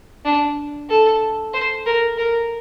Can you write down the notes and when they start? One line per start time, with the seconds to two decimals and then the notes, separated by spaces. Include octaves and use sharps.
0.25 D4
0.89 A4
1.53 C5
1.86 A#4
2.18 A#4